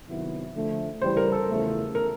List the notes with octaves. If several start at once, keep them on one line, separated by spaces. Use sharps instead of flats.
C3 D#3 F#3 B3 E4
D3 F3 A3
C#3 E3 G3 C5
A#4
A4
E2 C#3 F3 A3
A#4